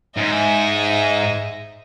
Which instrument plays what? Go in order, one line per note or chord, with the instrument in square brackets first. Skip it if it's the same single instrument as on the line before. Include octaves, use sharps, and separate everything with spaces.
[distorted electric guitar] G#2 [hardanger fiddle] D#5 E5